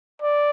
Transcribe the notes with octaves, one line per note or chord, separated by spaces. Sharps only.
D5